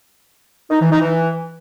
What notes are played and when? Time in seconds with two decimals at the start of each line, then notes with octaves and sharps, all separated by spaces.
0.70 D#4
0.80 E3
0.90 D#4
1.00 E3